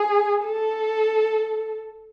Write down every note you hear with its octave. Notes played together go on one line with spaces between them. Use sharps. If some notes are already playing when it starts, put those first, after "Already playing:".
Already playing: G#4
A4